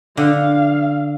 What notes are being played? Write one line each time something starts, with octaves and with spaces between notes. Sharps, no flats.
D3 F5